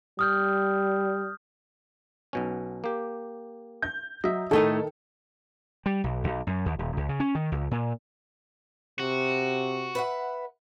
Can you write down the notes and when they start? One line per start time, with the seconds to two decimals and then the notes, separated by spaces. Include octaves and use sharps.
0.19 G3 D#6 F6 G6
2.33 B1 B2 C#4
2.84 A#3 G4
3.82 G6
4.24 F#3 D#5 E5
4.51 A2 D#3 A3 D#4 A4
5.86 G3
6.04 B1
6.24 B1
6.47 F#2
6.66 D#2
6.79 D#1
6.97 C#2
7.09 C#3
7.20 C#4
7.35 D#3
7.52 C#2
7.71 A#2
9.00 C3 F#4
9.95 B4 E5 F#5